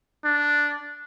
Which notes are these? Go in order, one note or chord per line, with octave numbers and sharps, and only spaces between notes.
D4